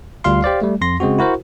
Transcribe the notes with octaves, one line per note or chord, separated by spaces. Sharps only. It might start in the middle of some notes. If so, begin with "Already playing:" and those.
D2 G3 F4 F5 C6
G4 C5 D5 F5
G3 A3
F2 C6 A#6
C#3 G#3 C4 F#4
E4 F#4 A#4 C5